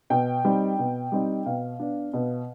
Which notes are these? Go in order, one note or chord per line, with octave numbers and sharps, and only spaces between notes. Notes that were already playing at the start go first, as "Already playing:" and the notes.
B2 G5
G3 C4 D#4
B2
G3 C4 D#4
B2 F5
B3 D4
B2